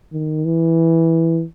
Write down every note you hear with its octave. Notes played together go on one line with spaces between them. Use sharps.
D#3
E3